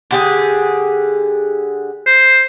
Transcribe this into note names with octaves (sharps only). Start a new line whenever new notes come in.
D3 G4 G#4
C5